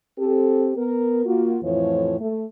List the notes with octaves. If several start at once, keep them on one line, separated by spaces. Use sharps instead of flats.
C4 G4 A4
B3 A#4
A#3 F4 F#4
F2 A2 E3 F3 F4 C#5
A3